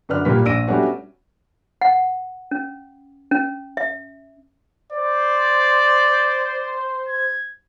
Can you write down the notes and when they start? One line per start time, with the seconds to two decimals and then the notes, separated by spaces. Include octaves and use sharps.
0.09 F#2 D3 D4 B4 D5 F6
0.25 A#2 G3 A#3 B4 B6
0.45 A#1 D5 E6 A#6 D7 D#7
0.67 G3 A3 B3 C#4 D4 F#4
1.81 F#5
2.51 C#4
3.31 C#4
3.77 E5
4.92 C5 D5
7.09 G#6